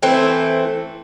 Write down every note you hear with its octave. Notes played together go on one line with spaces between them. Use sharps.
E3 A3 C4 E4